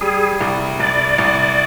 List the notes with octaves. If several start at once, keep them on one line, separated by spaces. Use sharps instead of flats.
G3 G#4
C2
C2 D5
C2